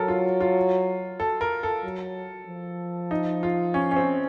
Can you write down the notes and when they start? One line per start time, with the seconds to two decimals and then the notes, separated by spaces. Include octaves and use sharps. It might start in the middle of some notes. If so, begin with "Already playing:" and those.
Already playing: F#3 A4 A#4
0.08 F4
0.40 F4
1.20 A4
1.41 A#4
1.63 A4
1.84 F#3
2.47 F3
3.11 D#4
3.43 F4
3.74 C#4
3.91 C#4
3.96 C4